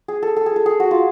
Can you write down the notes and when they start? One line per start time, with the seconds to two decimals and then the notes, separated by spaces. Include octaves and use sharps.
0.08 G#4
0.23 A4
0.37 A4
0.46 G#4
0.56 A4
0.66 G#4
0.80 F#4
0.91 F4